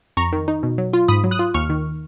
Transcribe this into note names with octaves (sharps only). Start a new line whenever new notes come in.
F2 A#5 C#6
D#3
D#4
B2
F#3
F4
G#2 B5 D#6
F#3
D#6 F#6
F4
D#2 C#6 F6
D#3